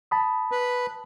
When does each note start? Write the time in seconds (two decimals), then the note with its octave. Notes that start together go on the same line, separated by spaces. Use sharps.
0.11 A5 B5 D#6
0.52 B4